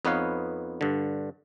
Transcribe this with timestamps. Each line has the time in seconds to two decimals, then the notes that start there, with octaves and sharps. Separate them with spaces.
0.05 F2 B3 D#4 B4 C#5 F5
0.81 G2 D3